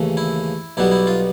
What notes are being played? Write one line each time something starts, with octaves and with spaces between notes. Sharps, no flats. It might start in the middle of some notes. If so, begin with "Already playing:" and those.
Already playing: D#2 C#3 E3 A3
E4
B1 B2 G3 B3 E4
E4
F4